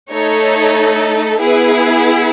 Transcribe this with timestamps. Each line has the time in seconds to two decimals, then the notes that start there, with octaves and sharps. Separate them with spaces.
0.11 A3 D#4 A4 C#5
1.39 B3 E4 G#4 B4